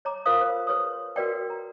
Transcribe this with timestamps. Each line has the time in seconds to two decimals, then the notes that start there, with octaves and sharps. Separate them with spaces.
0.05 C#5 A#5 D6
0.26 F4 A#4 C5 F5 D#6
0.41 C5
0.67 G#4 B4 C#5 C6 D#6
1.16 F#4 A#4 B4 D5 F#5 G5
1.50 A#5